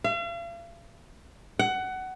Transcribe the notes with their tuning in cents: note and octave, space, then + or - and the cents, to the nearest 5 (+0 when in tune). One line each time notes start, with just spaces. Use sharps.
F5 -45
F#5 +20